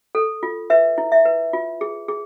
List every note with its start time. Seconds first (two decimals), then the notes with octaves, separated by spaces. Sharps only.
0.15 A4
0.43 F4
0.70 B4 E5
0.98 E4
1.12 E5
1.25 B4
1.53 F4
1.81 G#4
2.08 G#4